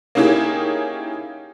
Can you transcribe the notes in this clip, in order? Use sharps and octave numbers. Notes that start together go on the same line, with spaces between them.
A#3 C#4 D#4 E4 G4 G#4